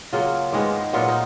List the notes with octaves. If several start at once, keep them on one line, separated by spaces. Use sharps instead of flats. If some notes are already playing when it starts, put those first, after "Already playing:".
C#3 F#3 A#3 F4
G#2 D#3 G#3 B3
A#2 F#3 B3 F4
D#4